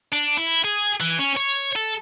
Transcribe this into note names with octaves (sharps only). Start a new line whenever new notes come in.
D4
E4
G#4
E3
C#4
C#5
A4